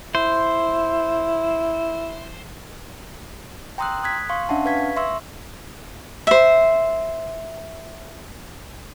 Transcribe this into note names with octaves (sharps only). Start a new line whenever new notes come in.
E4 C5
G5 A#5 C6 D#6 E6 F#6
D#6 F#6 G#6 B6
F5 C6 C#6
C#4 D4 E5 F#5 A5
B4 F5 C#6 G#6 B6
E5 C6 C#6 E6
C5 E5